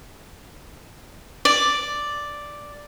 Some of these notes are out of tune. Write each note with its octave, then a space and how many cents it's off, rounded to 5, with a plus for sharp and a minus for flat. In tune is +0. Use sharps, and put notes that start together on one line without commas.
D5 +0